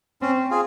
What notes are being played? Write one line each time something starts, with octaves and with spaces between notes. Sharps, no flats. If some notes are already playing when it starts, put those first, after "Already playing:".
C4 C#4
F4 G#4